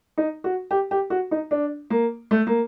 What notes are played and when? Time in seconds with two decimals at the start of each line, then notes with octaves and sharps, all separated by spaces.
0.18 D#4
0.44 F#4
0.71 G4
0.91 G4
1.10 F#4
1.31 D#4
1.51 D4
1.90 A#3
2.31 A3
2.47 A#3